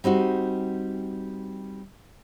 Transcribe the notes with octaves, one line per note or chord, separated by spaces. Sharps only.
G3 C4 D#4 F#4